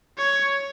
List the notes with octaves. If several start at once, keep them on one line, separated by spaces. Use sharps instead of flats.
C#5